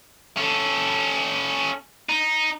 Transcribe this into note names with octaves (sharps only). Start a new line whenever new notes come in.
C#4 A4
D#4